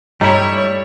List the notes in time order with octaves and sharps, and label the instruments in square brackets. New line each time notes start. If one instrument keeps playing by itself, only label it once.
[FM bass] G2 [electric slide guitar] G3 A3 E4 [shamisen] D#4 [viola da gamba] C#5